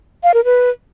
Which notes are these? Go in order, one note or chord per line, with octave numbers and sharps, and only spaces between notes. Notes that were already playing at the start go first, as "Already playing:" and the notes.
F5
A#4
B4